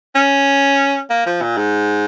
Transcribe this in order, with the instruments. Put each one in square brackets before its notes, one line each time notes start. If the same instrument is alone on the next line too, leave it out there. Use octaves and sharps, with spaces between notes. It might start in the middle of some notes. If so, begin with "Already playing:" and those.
[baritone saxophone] C#4
A#3
F3
A#2
G#2